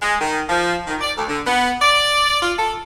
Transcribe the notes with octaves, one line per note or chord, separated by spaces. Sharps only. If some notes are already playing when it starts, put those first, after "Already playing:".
G#3
D#3
F3
D#3
D5
D2
D3
B3
D5
F4
A4